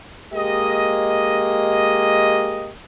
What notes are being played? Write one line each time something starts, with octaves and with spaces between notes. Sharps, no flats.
G#3 A#3 G4 D#5